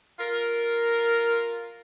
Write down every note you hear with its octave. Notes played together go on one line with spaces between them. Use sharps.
F4 A#4